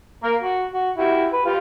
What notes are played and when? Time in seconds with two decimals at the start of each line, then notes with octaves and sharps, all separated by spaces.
0.24 A#3 A#4
0.42 F#4
0.74 F#4
0.98 E4 F#4 G4
1.33 B4
1.46 F4 G4 F5